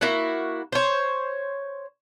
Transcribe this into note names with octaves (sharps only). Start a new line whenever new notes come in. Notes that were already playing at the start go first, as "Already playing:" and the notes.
A#3 E4 F#4 F#5
C5 C#5